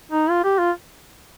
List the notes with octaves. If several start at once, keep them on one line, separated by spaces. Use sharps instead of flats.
D#4
F4
G4
F4